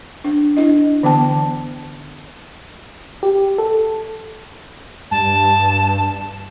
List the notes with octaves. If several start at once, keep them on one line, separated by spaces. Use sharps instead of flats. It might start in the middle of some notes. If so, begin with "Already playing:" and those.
D4
D4 E4 D#5
D3 E3 B3 G5 A5
G4
A4
G2 A5